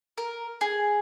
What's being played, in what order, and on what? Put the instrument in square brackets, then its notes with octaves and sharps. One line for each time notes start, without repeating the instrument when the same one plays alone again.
[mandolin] A#4
G#4